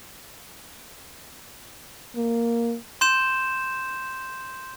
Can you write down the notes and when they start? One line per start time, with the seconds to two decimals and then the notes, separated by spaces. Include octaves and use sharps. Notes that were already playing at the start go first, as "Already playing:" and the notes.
2.16 A#3
3.01 C6 G6 E7